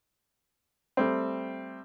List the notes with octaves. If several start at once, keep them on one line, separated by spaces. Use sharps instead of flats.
G3 A3 C4